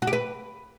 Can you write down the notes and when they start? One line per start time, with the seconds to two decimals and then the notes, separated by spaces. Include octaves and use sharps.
0.02 F#4
0.07 G4
0.13 B4